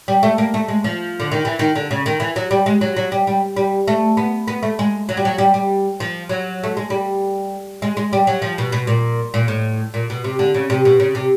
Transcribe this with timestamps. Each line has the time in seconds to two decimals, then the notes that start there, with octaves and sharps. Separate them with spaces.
0.08 G3
0.23 A3
0.38 A#3
0.54 A3
0.68 G#3
0.84 F3
1.20 D3
1.32 D#3
1.45 E3
1.59 D#3
1.76 D3
1.91 C#3
2.06 D#3
2.20 E3
2.36 F#3
2.51 G3
2.66 G#3
2.81 F#3
2.97 F#3
3.12 G3
3.27 G3
3.56 G3
3.87 A3
4.17 B3
4.48 B3
4.63 A3
4.79 G#3
5.09 F#3
5.17 G3
5.25 F#3
5.38 G3
5.54 G3
6.00 F3
6.29 F#3
6.64 A3
6.77 G#3
6.90 G3
7.82 G#3
7.97 G#3
8.13 G3
8.27 F#3
8.42 F3
8.58 B2
8.72 B2
8.87 A#2
9.34 A#2
9.48 A2
9.94 A#2
10.10 B2
10.24 C3
10.39 D3
10.54 C#3
10.70 C3
10.85 B2
11.00 C#3
11.15 C3